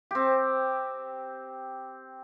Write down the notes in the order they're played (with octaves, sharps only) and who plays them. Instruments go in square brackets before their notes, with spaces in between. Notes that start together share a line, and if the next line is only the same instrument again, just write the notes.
[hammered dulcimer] C4 G4